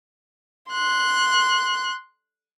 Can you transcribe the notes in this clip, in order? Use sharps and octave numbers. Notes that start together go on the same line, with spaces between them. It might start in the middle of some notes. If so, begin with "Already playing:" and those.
C6 F#6